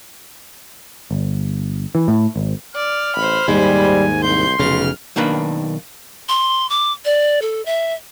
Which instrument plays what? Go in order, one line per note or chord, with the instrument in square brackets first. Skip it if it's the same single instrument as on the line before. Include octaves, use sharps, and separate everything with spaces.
[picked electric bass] G1
E3
A2
G#1
[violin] D5 [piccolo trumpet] F6
[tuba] A1 [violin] C5 B5
[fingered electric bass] D#2 G#2 [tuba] G3 [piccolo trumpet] G#5
[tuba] C2 [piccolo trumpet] C6 [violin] G6
[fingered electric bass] F1 C#3 [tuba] B1 [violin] F6
[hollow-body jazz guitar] B1 D#3 A#3 D4 B4
[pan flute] C6
D6
D5
A4
E5